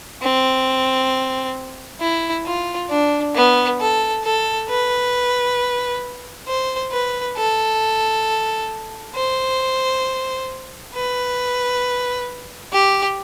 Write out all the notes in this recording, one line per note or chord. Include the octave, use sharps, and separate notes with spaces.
C4
E4
F4
D4
B3
A4
A4
B4
C5
B4
A4
C5
B4
G4